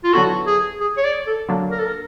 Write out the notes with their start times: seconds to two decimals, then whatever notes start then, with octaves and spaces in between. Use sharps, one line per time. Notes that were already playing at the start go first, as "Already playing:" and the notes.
0.04 F4
0.13 D3 F#3 B3 E4 F#4 A4
0.47 G#4
0.80 G#4
0.97 C#5
1.04 D5
1.27 A4
1.49 D3 F#3 A#3 D4
1.71 A#4
1.79 A4
1.86 A#4